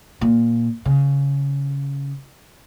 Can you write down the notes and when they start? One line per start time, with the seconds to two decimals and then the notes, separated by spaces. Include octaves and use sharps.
0.21 A#2
0.85 C#3